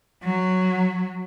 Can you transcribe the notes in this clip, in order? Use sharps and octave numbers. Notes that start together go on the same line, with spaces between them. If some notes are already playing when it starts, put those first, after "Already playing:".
F#3